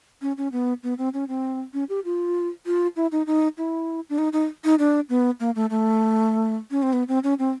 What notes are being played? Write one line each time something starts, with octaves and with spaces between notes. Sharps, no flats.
C#4
C#4
B3
B3
C4
C#4
C4
C#4
G4
F4
F4
E4
D#4
D#4
E4
D4
D#4
D#4
D#4
D4
B3
A#3
A3
A3
C#4
C4
B3
C4
C#4
C4